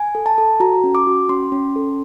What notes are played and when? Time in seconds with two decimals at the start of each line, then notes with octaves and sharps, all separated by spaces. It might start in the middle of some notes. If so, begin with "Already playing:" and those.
Already playing: G#5
0.15 A4
0.26 A5
0.38 A4
0.60 F#4 A#5
0.84 C#4
0.95 D6
1.07 F#4
1.29 C#4 C6
1.52 C#4
1.76 A4